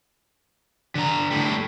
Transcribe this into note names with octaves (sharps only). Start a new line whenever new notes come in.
D3 A#5
A2 G3